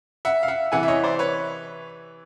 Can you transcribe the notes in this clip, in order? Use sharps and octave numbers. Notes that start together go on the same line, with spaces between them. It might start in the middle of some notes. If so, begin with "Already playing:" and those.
E5 F#5
F5
E5 F#5
C3 E3 F#5 G#5
E5
C#5 D#5
C5 D5
B4 C#5